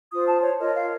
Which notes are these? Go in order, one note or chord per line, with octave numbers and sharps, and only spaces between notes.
F4 C5 D#6
A5
C#5
F4 A#4 C#5 D#5
F5